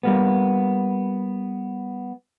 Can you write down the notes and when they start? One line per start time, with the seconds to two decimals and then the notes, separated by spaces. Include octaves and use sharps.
0.03 G3 A#3 B3